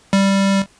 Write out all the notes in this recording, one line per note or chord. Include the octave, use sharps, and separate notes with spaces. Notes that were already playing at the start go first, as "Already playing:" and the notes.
G3